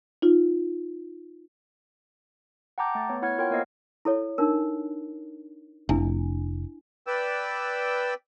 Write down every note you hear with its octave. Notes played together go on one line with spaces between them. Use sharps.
D#4 F4
F#5 G5 A5 A#5 D6 G6
A3 A6
B3 C#5
E4 C#5 F#5 F6 G#6
F4 A#4 C#5 F#5 G5
A#3 B3 A#4 C5 D#5 C7
E4 A4 C#5
D4 D#4 A#4
F1 D4 E4 G#5
B4 D5 G5 E6